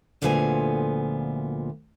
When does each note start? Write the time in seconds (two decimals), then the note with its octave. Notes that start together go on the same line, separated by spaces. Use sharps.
0.22 D2 A#2 D3 F3 B3 G#5